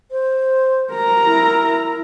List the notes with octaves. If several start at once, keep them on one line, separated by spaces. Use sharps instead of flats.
C5
A#4 A#5
E4